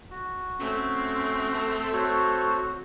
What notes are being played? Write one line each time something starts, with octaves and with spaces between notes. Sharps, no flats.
F#4
A3 C4 C#4
A4
F#4 A4 C5 C#5